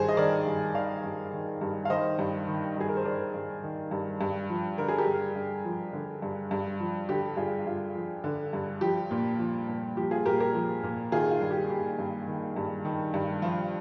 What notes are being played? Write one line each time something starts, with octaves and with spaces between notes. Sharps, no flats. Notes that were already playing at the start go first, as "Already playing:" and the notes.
Already playing: G2 D#3 G#4 C5
D#5
D#3 A#4 D5
G2
D#3 D5 F5
G2
D#3
G2
F5
D#3 C5 D#5
G2
D#3
G2 G#4
A#4
C5
D#3 A#4 D5
G2
D#3
G2
G2
F3
D3 A#4
G#4
G4 A#4
G2
G2
F3
D3
G2
G2
F3
D3 G4
G2 F4 G#4
G2 F4
F3
D3
G2
F3 G4
A#2
F3
A#2
F3 G4
F4 G#4
A#2 G4 A#4
G4 A#4
F3
A#2
D#3 F4 G#4
F4
G2
G4
D#3 G4
G2
D#3
G2
D#3
G2
F3 F4